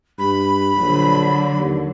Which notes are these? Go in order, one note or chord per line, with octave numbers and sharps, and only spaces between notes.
G2 B5
A#1 D3 F#3
D#2